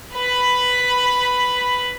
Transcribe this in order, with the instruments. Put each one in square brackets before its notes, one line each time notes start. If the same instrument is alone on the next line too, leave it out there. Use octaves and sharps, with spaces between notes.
[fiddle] B4 B5